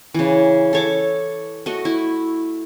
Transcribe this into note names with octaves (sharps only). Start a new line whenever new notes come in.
C#3 E3
A4 C#5 D6
A3 F#4 D#5
E4